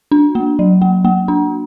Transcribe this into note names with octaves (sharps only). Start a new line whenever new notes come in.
D4
A#3
F#3
A#3
A#3
D4